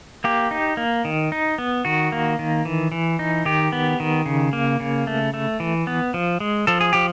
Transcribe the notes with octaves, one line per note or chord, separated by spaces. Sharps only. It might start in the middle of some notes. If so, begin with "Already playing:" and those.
A#3 G4
D#4
A#3
D#3
D#4
B3
D#3 F#4
A#3
D#3
E3
E3
D#4
D#3 G4
B3
D#3
C#3
A#3
C#3
A3
A3
E3
B3
F3
G#3
F3 A4
G#4
F3 G4